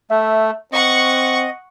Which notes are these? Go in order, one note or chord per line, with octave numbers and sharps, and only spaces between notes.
A3 E5
C4 D#5 F#5 C#6